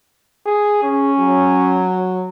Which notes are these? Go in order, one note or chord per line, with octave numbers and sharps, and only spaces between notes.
G#4
C#4 G#4
F#3